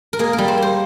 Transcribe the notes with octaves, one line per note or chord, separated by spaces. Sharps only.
A#4
A#3 G#4
A#4
G3
C5
A#3
C5